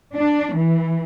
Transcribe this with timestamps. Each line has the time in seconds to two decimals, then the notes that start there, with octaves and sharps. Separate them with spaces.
0.15 D4
0.55 E3